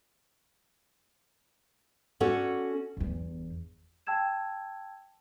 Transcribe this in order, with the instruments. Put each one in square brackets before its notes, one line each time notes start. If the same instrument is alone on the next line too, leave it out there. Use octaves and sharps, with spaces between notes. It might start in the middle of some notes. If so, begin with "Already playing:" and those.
[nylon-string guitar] C#4 F#4 A4 D5 F#5
[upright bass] G1 E2
[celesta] G5 A5 E6 G#6 E7